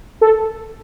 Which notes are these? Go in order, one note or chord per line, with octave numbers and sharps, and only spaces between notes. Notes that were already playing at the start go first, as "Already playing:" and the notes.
A4